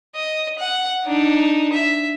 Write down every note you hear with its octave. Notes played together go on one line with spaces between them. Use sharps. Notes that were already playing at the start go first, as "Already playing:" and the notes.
D#5
F#5
D4 D#4
E5